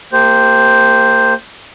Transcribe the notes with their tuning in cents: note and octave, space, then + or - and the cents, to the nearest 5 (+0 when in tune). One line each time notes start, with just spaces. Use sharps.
A#3 -30 G4 +0 C5 +0